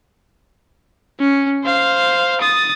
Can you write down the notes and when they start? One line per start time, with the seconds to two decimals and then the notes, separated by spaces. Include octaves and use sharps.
1.20 C#4
1.64 C5 F5
2.41 D#6 A6